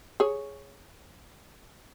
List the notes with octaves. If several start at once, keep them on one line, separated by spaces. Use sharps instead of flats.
G#4 C#5